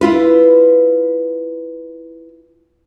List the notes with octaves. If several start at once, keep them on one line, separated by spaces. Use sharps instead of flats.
E4 F4 B4